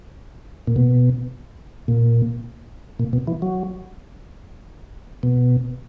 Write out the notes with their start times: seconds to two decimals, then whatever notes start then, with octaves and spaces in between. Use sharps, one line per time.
0.67 A#2
0.76 B2
1.88 A#2
2.99 A#2
3.13 B2
3.27 E3
3.42 F#3
5.23 B2